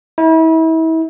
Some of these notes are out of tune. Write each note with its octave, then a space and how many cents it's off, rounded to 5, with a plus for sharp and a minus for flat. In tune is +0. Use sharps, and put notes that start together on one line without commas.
E4 -35